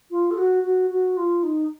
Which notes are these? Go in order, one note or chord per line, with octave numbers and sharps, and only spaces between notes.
F4
A4
F#4
F#4
F#4
F4
D#4